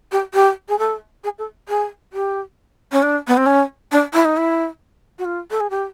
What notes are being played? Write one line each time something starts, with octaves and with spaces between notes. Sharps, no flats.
G4
G4
G#4
A4
G#4
A4
G#4
G4
C#4
D4
B3
C4
C#4
D4
E4
D#4
E4
F#4
F4
A4
G#4
G4